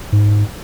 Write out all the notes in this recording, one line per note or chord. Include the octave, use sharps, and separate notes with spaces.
G#2